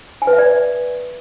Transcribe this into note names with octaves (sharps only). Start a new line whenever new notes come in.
G#5
B4
E5
D5